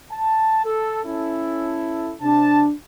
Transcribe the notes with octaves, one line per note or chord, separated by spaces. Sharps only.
A5
A4
C#4 E4 A4
C3 D4 A5